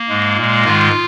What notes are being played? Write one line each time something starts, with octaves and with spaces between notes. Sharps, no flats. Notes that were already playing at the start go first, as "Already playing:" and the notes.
Already playing: A#3
G#2 G#3
A#2 G#3
G#2 D#3 G#3 F4